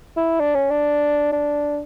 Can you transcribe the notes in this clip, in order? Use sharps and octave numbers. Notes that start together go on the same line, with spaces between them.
E4
D4
C#4
D4
D4